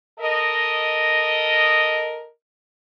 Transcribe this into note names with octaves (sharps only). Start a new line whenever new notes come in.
A4 A#4 D#5